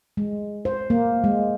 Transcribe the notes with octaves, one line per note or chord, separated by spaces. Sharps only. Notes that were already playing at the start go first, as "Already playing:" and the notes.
G#3
C5
A#3
G#3